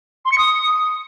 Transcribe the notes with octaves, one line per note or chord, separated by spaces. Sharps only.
C6
C#7
D#6